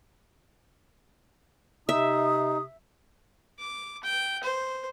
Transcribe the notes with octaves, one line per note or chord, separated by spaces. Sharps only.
C3 D#4 E5 D#6
D6
G5
C5